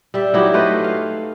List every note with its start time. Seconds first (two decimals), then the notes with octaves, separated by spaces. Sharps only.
0.14 G3 E5
0.34 F#3 D#4 E4 G4
0.54 A3 B4 C5 D#5
0.84 F5